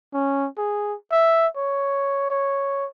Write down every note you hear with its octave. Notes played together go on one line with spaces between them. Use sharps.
C#4
G#4
E5
C#5
C#5